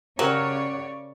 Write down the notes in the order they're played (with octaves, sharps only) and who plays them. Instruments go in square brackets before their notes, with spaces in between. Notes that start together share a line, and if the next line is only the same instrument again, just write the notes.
[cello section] C#3 C#5 D5 [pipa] F#3 [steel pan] G4 A#4 D#6